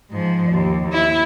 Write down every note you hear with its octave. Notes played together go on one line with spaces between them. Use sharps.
G#2 F3
D#2
E4